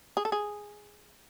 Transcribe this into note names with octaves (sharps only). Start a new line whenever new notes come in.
G#4
A4
G#4